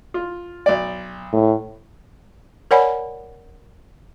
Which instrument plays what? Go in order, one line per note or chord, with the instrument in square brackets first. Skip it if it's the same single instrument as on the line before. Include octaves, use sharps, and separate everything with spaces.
[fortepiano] F4
B1 D5
[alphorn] A2
[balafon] A#4 C#5 D5 F#5 G#5 B5